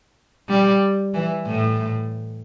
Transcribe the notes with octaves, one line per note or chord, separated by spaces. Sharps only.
G3
E3
A2